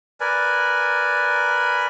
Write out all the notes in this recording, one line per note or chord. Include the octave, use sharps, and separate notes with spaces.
A#4 B4 D5 G#5